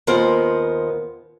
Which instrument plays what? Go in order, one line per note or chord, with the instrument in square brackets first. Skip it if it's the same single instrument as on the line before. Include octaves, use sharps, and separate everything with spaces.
[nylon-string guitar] D#2 B3 F4 A#4 C5